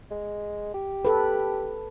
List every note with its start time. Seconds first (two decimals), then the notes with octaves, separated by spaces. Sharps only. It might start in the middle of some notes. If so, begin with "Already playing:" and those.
0.11 G#3
0.74 G4
1.05 A4 B4